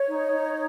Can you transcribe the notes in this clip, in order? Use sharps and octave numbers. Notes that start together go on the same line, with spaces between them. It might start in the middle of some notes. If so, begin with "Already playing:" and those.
Already playing: C#5
D#4
D#4